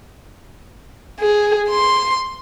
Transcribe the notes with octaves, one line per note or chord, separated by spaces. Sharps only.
G#4
C6